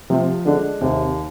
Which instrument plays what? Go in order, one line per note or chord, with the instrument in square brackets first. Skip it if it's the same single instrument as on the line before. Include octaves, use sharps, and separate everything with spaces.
[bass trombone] C3 [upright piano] F3
[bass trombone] D3 [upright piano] G#3 D4
[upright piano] D#2 [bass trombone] C3